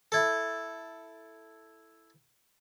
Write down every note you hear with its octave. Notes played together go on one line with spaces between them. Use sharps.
E4 A4